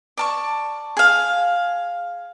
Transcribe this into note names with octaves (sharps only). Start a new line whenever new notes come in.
D5 A5 C#6
G#4 F5